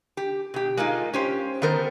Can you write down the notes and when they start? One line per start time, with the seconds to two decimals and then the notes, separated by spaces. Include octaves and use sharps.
0.17 G4
0.54 B2 G4
0.77 G#3 A#3 D#4 F4
1.14 C#4 G4 C5
1.62 D#3 B3 A4 A#4 C5